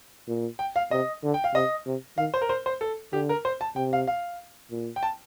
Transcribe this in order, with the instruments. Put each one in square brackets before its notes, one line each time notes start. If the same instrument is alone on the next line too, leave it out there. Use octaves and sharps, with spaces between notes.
[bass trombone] A#2
[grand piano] G5
F5
[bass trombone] C3 [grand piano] D#5
[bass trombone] D3
[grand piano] G5
F5
[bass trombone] C3 [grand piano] D#5
[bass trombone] C3
[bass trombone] D#3 [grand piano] F5
[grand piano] C5
A#4
C5
C5
A4
[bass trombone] D3 [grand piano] G4
[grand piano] A#4
C5
A5
[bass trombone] C3 [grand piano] G5
[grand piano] F5
F5
[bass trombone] A#2
[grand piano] G5
A5